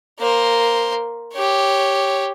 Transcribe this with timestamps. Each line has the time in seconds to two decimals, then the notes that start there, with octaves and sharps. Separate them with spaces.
0.20 A#3 C5
1.33 G4 C#5